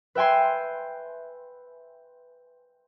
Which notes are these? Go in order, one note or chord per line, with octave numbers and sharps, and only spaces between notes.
B4 E5 G5 G#5 C6